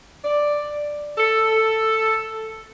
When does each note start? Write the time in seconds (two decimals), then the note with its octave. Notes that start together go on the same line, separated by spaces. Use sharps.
0.25 D5
1.18 A4